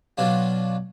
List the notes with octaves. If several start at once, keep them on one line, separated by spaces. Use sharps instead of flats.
B2 F#3 D4 F4